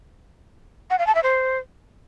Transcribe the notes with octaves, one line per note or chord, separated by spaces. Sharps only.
F#5
F5
A5
E5
C5